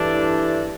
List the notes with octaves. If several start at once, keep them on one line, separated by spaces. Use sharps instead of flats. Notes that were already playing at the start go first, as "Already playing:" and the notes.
Already playing: G2 E3 A3 D4